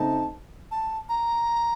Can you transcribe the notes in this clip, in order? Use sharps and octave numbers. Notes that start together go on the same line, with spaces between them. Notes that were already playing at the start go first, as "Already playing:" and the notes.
Already playing: C#3 A3 C4 D#4 A5
A5
A#5